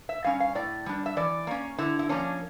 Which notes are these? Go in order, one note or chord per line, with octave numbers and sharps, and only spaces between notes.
E5
G3 C#4 F5
F5
A2 D5
G3 D4
E5
E3 D5
A#3 C#4
D3 E4
E4
F3 A#3 C#4 D4